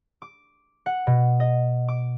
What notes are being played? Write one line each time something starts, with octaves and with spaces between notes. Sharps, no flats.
D6
F#5
B2
D#5
D6